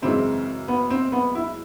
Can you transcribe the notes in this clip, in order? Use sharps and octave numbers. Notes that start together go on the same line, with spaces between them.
F#2 C#3 E3 G#3 C4
B3
C4
B3
E4